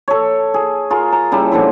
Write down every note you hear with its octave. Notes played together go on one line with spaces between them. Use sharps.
A4 C#5
G#4
F4 G#4 A#4
A#5
C#3 G3 E4 A5
A#2 D3 F3 E4